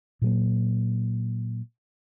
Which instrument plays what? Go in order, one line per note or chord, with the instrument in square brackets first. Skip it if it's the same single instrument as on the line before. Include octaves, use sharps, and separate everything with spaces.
[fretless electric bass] A#2 F#3 A#3